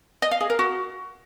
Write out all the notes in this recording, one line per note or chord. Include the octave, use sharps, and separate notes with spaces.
D#5
F5
G#4
A#4
F#4